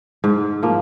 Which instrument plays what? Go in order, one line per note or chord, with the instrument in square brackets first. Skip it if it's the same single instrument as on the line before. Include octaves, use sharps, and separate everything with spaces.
[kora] G#2
F3 A#3